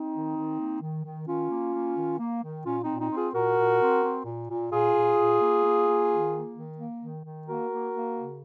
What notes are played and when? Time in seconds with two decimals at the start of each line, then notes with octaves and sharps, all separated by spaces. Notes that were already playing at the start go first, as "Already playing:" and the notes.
Already playing: C4 D#4
0.12 D#3
0.35 D#3
0.58 A#3
0.81 D#3
1.04 D#3
1.27 D#3 C#4 F4
1.50 A#3
1.73 A#3
1.96 D#3
2.19 A#3
2.42 D#3
2.64 A#2 C#4 F4
2.82 C4 D#4
2.88 A#2
2.99 C4 D#4
3.10 C4
3.16 F4 G#4
3.34 A#2 F#4 A#4
3.56 A#2
3.80 C4
4.02 C4
4.25 A#2
4.48 A#2
4.71 A#2 F4 G#4
4.94 A#2
5.17 A#2
5.40 A#3
5.63 A#3
5.86 A#3
6.09 D#3
6.32 A#3
6.55 D#3
6.78 A#3
7.01 D#3
7.23 D#3
7.46 A#3 F#4 A#4
7.69 A#3
7.92 A#3
8.15 C#3